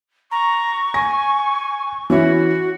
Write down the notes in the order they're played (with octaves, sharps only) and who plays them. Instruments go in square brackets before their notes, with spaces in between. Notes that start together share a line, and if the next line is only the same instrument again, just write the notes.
[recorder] A#5 [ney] C#6
[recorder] G#5 [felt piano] A#6
[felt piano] E3 C#4 E4 [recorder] F#4